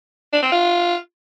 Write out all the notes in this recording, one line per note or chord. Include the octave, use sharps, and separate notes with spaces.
D4
C4
F4